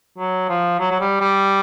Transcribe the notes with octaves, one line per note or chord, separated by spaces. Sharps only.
F#3
F3
F#3
F#3
G3
G3